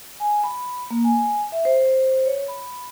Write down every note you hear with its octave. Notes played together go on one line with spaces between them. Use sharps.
G#5
B5
A#3
G#5
E5
C5
C#5
B5